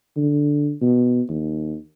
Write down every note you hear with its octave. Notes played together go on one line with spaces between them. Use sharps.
D3
B2
D#2